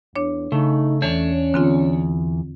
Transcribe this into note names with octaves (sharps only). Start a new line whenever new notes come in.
E2 D4 C#5
C#3 A3 D#4
E2 E3 C#4 D4 C#5
E2 D3 C4 F4